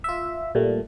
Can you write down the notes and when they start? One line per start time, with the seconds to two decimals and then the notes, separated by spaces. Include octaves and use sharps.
0.04 F4 E5
0.55 A#2 G3 A3